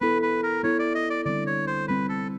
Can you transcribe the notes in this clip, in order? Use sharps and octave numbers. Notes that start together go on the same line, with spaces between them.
B3 E4 A4 B4
B4
A#4
B3 E4 A4 C#5
D5
D#5
D5
D3 G3 C4 D5
C#5
C5
D3 G3 C4 B4
A4